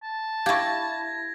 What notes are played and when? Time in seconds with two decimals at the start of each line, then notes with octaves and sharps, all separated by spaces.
0.03 A5
0.46 E4 G4 F5 C#6 G#6 A#6